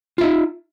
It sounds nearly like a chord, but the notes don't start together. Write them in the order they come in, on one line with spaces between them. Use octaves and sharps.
F4 E5 D#4